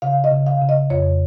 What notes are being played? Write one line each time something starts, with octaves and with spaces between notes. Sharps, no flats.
C#3 F5
D#5
C#3
F5
C#3
D#5
F2 C#5